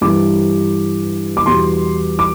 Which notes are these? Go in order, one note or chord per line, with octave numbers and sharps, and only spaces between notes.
G2 E3 G3 D6
D6
E2 B2 G3 C6
D6